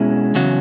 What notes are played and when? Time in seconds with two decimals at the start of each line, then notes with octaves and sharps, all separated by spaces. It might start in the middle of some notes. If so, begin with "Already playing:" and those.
Already playing: B2 G#3 C#4 E4
0.35 E2 C#3 F#3